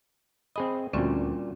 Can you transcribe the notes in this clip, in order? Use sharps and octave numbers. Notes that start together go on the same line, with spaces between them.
C4 G#4 D#5 B5
D2 A#2 G3 C4 C#4 F#4